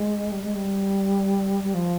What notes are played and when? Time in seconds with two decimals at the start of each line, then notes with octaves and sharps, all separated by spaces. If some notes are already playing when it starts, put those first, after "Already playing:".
Already playing: G#3
0.32 G3
0.43 G#3
0.55 G3
1.64 G3
1.74 F3